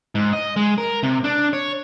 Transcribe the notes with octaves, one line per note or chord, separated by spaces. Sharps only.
G#2
D#5
G#3
A#4
C3
D4
C#5